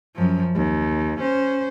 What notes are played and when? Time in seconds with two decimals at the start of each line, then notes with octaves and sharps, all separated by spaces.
0.15 F#2 F3
0.55 D#2
1.20 C#4 C5